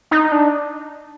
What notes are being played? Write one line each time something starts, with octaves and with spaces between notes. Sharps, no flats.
D#4
D4